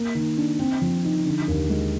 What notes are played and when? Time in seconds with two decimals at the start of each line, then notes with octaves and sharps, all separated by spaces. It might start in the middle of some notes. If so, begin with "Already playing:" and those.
Already playing: A#3
0.15 D#3
0.37 D4
0.59 C4
0.81 F3
1.04 D#4
1.26 D3
1.48 D#2
1.70 G#3